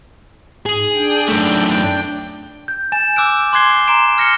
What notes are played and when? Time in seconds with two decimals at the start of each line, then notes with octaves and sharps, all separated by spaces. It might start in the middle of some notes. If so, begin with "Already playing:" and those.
0.66 G#2 G#4
0.94 D4 G5
1.28 F#2 A3
2.68 G6
2.92 G#5 A6 E7
3.16 D6 E6 F#6 D7
3.53 C6 D6 F#6 G#6 C7 G7
3.87 A#5 C6 D7 E7
4.18 F6 A#6 C#7 G7